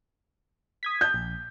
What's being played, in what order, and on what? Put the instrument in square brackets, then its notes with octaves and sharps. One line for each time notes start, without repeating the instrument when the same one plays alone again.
[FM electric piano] D#6 G#6 B6
[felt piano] G6
[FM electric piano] A#1